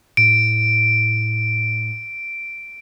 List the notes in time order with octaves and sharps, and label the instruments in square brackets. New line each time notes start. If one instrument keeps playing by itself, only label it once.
[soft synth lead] A2 [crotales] D7